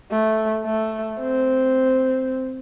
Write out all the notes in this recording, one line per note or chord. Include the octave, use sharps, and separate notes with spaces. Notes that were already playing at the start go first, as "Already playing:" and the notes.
A3
A3
C4